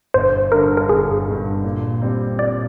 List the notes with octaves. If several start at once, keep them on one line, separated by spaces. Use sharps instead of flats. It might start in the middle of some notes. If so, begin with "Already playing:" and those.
G1 C5
G2 D3 A#4
A#4
G1 G#4
G2 D3
A#2
G3 C4
A#2 D5